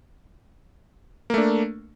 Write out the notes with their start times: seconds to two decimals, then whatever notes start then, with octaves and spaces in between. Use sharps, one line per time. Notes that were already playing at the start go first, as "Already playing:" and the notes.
1.30 A#3
1.34 A3
1.38 D4